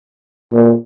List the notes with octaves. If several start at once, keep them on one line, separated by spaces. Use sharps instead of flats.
A#2